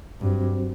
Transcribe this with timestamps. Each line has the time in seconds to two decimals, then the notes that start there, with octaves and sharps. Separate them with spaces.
0.21 G2 F#3 C4 F#4 C5